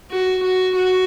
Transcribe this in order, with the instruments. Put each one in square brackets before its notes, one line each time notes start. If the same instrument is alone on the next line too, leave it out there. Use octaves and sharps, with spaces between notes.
[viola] F#4
F#4
F#4